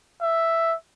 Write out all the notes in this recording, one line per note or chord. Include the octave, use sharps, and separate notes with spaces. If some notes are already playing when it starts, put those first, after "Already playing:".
E5